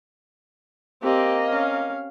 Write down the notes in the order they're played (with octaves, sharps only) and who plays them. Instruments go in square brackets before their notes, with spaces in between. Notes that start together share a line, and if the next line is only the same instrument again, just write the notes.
[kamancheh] A#3 D#5 [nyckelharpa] C4 G4
[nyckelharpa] C#4 F5